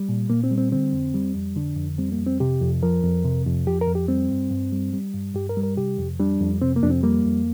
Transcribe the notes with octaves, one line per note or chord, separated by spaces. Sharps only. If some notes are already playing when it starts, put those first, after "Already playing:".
Already playing: G3
A#2
A#2 A#3
C4
G3
C4
D3 C4
F2
G3
F2
D3 D4
F2
G3 C4
A#3
F2
C4
C3 G4
F2
F3 A#4
F2
C3
F2
F3 G4
A#4
F2
G4
G3 C4
G2
G2
G3
G3
G2
G2 G4
A#4
G3
A#4
C3 G4
F2
G3 D4
F2
C3 C4
A#3
F2 D4
C4
G3 A#3
F2